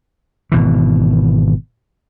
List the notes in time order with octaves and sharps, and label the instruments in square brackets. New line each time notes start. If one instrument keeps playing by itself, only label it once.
[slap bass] G#1 B2 E3